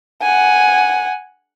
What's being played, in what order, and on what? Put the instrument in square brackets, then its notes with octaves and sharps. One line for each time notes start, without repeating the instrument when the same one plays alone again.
[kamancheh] F#5 G#5